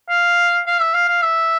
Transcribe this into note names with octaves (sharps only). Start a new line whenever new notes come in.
F5
F5
E5
F5
F5
E5